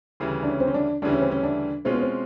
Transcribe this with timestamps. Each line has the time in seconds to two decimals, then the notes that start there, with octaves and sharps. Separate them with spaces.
0.20 D2 C#3 E3 G3
0.43 D4
0.47 C#4
0.60 C4
0.68 C#4
0.74 D4
1.02 D2 C#3 E3 G3 D4
1.12 C#4
1.22 C4
1.32 C#4
1.43 D4
1.85 B2 G#3 C4 C#4 F4
1.93 B3
2.02 C4